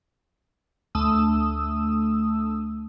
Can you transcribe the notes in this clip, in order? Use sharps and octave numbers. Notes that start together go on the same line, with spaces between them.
D2 A3 D#6 E6